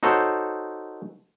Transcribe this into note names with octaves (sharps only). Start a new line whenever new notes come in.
D#4 F#4 A4 C5 C#5